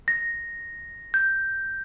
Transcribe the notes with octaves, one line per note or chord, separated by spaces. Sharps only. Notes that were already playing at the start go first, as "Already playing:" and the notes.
A#6
G6